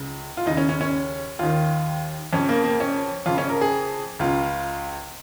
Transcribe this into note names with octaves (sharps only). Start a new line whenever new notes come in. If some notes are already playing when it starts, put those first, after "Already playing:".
Already playing: C#2 C#3
F4
D#2 C#3 D#4
C#4
C#4
C#4
D#2 D#3 F4
F2 C#3 C#4
A#3
A#3
C#4
F2 C#3 F4
C#4
A#4
G#4
C#2 C#3 F4